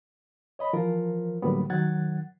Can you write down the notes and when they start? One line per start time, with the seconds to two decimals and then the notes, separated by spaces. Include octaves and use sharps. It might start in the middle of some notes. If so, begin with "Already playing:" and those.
0.59 C#5 D#5 B5
0.73 E3 F3 F4 A#4
1.42 A2 D3 F#3 G3 A#3 B3
1.70 D#3 F#3 F#5 F#6 G#6 A6